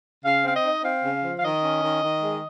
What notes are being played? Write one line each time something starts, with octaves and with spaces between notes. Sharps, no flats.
C#3 F5
C4 F5
D#5
D#4
C4 F5
C#3
F3
F5
D#3 D#5
C#4
D#3
D#3
G#3